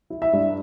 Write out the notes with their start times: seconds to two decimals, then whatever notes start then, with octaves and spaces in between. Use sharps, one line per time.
0.10 E4
0.22 E5
0.33 G2